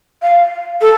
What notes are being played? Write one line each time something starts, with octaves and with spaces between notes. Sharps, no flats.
F5
A4